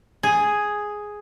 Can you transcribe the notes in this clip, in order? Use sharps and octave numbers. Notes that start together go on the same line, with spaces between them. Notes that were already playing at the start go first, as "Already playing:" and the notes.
G#4